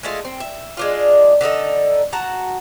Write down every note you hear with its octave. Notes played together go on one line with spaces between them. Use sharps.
G#3 A3 F4
C4
E5
G#3 D4 F4
D3 D4 D#4 A4
F#4 F#5 A5 A#5